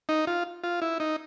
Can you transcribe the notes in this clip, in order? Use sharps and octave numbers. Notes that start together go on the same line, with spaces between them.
D#4
F4
F4
E4
D#4